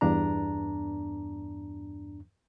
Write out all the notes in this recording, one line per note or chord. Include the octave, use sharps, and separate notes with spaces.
E2 G2 D4 A#5